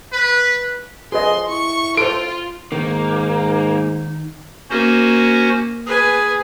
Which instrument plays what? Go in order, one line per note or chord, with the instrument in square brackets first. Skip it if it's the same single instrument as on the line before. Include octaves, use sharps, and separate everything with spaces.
[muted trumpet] B4
[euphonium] F2 [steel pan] G#4 B4 D#5 [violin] C6
[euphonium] E4 [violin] C#6
[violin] F4 [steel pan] A4 C5 [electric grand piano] D7
[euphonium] G#2 [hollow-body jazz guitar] D#3 [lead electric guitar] A#3 [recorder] D#4
[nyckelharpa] A#3 [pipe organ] C#4 F#4 C5
[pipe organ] G#4 [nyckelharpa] B4 G#5